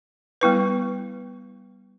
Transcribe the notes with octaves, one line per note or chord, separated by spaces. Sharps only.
G3 B3 E4 B4